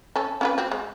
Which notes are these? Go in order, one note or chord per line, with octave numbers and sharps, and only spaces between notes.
C#4 A4
C#4 F4 B4
C4 F#4
G#3